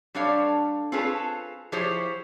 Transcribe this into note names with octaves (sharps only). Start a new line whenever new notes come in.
G3 D4 A4 C#5 F5
C4 F4 G#4 A4 B4 C#5
F3 E4 G4 G#4 C5 C#5